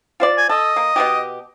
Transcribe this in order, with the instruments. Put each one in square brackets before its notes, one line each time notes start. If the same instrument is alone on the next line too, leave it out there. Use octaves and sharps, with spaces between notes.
[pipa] F4 C5 D5
[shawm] G#5
[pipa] A4 [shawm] D#5
[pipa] A#3
B2 G3 G4